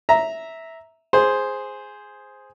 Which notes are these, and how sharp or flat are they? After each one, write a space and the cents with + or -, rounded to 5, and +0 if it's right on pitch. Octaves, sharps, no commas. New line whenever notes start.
E5 -10 A#5 +0
G#4 +0 C5 +0